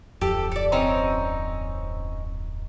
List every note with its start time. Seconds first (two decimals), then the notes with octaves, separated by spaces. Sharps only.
0.21 D1 F2 G4 A4
0.52 A4 D5
0.72 C4 C#4 D#4